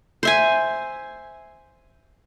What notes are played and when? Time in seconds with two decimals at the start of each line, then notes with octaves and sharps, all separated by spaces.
0.23 C5 E5 G#5